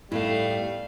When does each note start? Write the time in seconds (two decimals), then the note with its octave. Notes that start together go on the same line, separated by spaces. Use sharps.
0.12 A2 G3 A3 B3 D#4 E4 F5 G5